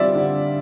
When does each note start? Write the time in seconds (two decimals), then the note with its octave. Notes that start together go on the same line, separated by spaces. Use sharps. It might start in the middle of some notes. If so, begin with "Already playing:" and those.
Already playing: D3 G3 C4 F4 D5 E5
0.15 D3